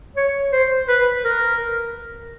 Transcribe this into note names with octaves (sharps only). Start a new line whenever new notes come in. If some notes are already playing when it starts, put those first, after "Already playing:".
C#5
C5
B4
A#4